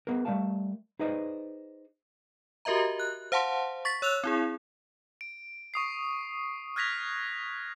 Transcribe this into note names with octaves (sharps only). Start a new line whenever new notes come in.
B3 G#4 A#4
G3 A3 A#4 D5 F5 A5
D#4 G#4 B4 C5 D5 D#5
F#4 G4 A#4 D#5 E5 A#5
F#6
C5 F5 F#5 A5 C6
C#6 A6 B6
C#5 E6 F#6 F7
C4 E4 G#4
D7
C#6 D#6 C7
F6 F#6 G#6 A#6 B6 F7